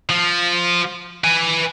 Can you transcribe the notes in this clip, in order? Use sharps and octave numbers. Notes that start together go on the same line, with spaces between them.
F3
B4 G#5